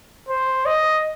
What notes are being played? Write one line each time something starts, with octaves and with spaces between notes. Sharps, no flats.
C5
D#5